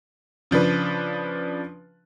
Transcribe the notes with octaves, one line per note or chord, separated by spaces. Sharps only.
C#3 F3 D4 B4